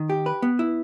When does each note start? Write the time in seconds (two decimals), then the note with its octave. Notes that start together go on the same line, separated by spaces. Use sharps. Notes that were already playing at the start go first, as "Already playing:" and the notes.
Already playing: D#3
0.10 G4
0.26 B4
0.42 B3
0.59 E4